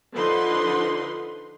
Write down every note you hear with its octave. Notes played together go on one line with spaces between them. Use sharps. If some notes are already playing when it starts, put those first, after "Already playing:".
D3 F3 D#4 B4 C6